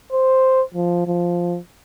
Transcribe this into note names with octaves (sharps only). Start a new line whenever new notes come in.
C5
F3
F3